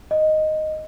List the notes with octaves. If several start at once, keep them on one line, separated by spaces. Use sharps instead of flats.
D#5